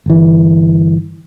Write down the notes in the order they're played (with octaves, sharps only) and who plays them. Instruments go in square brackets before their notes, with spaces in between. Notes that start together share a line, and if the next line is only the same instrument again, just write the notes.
[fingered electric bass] G1 E3